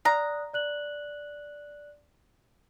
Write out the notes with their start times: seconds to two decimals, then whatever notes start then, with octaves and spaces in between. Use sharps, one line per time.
0.05 D5 F5 A#5 D#6 F#6
0.53 D5 F#6 F#7